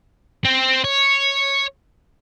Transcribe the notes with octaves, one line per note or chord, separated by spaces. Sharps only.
C4
C#5